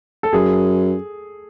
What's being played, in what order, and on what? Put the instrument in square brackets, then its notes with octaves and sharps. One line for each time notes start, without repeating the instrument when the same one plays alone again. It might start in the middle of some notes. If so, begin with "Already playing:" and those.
[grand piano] A4
[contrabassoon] F#2 [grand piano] G#4